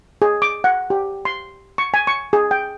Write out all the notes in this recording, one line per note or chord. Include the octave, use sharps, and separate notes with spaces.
G#4
D6
F#5
G4
C6
C#6
G#5
C#6
G#4
G5